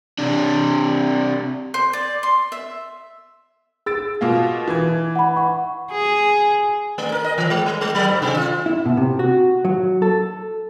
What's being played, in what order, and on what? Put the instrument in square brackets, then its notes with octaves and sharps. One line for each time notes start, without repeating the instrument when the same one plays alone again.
[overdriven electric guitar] C3 D4
[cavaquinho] C5
D5
C6
E5
[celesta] G#4 [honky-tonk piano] E6 A6 D7
[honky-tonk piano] B2 A#3 F4
E3 G#6
[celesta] F#5 B5
F#5 C#6
[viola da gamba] G#4
[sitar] A3
A#4
D#5
E3
G#3
G3
G#3
F#3
G#2
C3
F4
[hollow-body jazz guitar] E4
B2
C3
F#4
F#3
A4